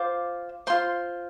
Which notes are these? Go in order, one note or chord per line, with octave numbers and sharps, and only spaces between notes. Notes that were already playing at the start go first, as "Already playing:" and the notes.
Already playing: F4 C5 D6
F4 C5 C6